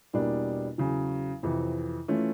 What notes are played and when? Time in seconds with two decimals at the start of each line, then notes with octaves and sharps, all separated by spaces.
0.13 E2 B2 G3 A#3 D4
0.78 E2 C#3 F#3
1.43 F2 C3 E3
2.08 E3 A3 C#4 F4